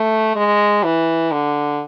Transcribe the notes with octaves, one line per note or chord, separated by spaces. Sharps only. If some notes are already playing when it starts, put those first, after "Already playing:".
Already playing: A3
G#3
E3
D3